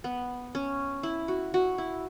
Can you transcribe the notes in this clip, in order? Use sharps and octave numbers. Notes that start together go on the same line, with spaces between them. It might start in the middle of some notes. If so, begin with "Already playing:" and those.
B3
C#4
E4
F#4
F#4
E4